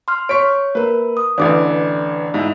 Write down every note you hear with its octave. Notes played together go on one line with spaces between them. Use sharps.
C6 F6
C#5 C#6 B6 D7
A#3 A#4 B4
D#6
A1 D3 E3 D5 D6
G#2 E4